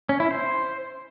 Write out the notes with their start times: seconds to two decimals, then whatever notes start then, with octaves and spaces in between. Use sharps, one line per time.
0.09 C#4
0.20 E4
0.31 C5